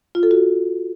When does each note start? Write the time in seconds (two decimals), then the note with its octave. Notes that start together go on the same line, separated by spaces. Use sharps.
0.15 F4
0.23 A4
0.31 F#4